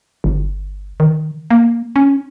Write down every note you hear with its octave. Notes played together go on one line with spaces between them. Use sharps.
G1
D#3
A#3
C#4